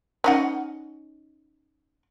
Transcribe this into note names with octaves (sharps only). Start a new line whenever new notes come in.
C#4 D#4 F#5